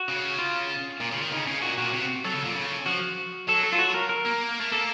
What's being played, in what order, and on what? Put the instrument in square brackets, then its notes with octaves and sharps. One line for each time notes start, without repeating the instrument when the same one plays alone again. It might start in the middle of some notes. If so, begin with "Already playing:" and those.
Already playing: [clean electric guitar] F#4
[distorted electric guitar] C#3
[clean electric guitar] F4
[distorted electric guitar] A#2
C#3
D#3
[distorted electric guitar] C#3 [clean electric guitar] D#4
[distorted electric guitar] C#3 [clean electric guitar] C#4
[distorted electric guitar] A#2 [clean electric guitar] F#4
[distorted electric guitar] A#2 [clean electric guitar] F#4
[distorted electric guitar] C3
[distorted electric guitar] F#3 [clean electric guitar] A4
[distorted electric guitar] C#3
A#2
C#3
[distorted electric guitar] F3 [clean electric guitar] F#4
[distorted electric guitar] F#3 [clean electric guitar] A4
[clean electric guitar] A4
F4
F#4
A#4
A#4
[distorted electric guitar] A#3
A3
[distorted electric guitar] A#3 [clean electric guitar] A4